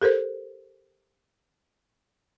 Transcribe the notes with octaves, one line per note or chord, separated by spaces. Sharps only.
G4 A4 A#4 C5